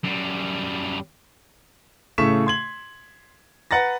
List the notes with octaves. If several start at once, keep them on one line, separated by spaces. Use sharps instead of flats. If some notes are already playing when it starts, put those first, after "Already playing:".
F#2 G3
A2 C#3 A3 C#6 B6 E7
C6 G#6 F#7
B4 F#5 A#5 A6 A#6